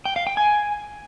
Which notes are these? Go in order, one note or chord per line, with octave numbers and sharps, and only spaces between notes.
G5
F5
G5
G#5